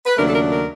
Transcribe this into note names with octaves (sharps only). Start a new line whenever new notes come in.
B4
D#2 C#3 F#3 A3 D4 A#4
A4
A#4
A#4